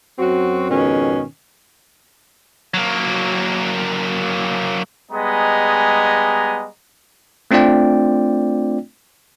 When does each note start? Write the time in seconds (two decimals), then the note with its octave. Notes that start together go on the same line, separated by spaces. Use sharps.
0.19 F#2 F#3 C4 F#4
0.70 F2 G#2 B2 D#3 C#4
2.74 F#3 A#3
5.11 G3 G#3 B3 D#5 G#5 A#5
7.51 A3 C4 D4 F4 D5 G5